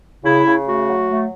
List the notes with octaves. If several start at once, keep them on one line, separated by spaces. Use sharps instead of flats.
C#3 E4
C#3
A3 F#4
F#3
A3